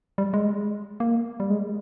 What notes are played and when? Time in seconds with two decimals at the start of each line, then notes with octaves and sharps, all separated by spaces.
0.18 G3
0.34 G#3
1.00 A#3
1.40 G3
1.50 G#3